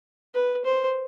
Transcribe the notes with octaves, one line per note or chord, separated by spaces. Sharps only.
B4
C5